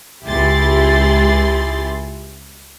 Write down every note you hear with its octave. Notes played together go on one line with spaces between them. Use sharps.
C#2 E4 G4 G#4 C6 A6